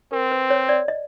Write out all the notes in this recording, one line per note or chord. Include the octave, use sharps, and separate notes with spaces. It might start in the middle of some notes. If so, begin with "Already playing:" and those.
C4 A#4
B4
C#5
D5
D#5